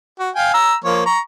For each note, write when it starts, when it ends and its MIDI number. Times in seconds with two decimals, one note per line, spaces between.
0.20 0.30 66
0.36 0.54 77
0.36 0.54 79
0.36 0.54 80
0.54 0.75 82
0.54 0.75 88
0.84 1.04 53
0.84 1.04 58
0.84 1.04 73
1.06 1.20 82
1.06 1.20 85